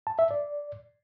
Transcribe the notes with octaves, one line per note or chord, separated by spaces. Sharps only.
A5
E5
D5